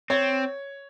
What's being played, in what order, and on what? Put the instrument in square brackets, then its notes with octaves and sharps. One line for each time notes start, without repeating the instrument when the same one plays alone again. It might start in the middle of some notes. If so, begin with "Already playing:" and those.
[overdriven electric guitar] C4 [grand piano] C#5